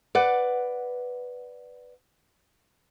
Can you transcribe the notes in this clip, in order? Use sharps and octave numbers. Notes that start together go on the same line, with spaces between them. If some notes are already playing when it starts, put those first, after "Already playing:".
B4 D5 F#5